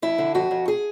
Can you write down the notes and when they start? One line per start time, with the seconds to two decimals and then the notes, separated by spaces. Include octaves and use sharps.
0.02 F2 E4
0.18 D3
0.35 F2 F#4
0.51 F2
0.68 G#4